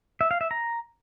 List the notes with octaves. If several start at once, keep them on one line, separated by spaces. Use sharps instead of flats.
E5
F5
E5
A#5